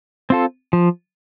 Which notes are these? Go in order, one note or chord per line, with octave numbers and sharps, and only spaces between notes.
C4 F4 A4
F3